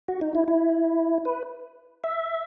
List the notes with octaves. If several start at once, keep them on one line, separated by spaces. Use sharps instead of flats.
F#4
D#4
E4
E4
B4
E5